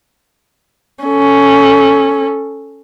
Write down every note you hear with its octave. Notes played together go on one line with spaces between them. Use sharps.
C#4 A4